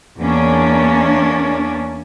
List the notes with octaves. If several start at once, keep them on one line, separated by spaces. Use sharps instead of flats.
E2 A#3 C#4 D4